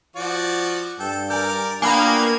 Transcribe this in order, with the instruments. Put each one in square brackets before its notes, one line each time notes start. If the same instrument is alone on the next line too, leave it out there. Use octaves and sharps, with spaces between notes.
[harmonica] F3 F#4 D5
[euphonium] G2 [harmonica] A4 G5
[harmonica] A#4 D5 [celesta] G#5 G6
[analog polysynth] A#3 G#6 [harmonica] B3 F4 G5 [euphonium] D4 [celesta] G#5 B5